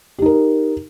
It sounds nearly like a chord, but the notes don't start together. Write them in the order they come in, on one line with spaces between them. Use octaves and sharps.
G4 D#4 A#4